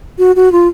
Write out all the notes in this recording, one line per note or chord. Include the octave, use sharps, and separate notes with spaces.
F#4
F#4
F4